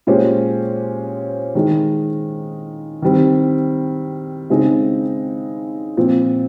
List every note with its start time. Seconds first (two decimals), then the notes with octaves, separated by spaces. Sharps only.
0.07 A#2 G#3 C#4 G4 C5
1.55 D#3 G#3 D#4
3.02 D#3 G3 C4
4.50 C#3 G#3 C4 D#4 G#4
5.97 A#2 F3 C4